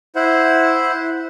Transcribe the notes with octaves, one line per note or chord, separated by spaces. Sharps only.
E4 C5 F#5